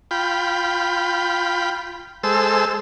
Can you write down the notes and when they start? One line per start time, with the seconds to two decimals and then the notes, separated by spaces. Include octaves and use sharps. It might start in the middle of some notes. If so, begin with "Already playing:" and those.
0.11 F4 G5 B5
2.23 G#3 A4 C5 E6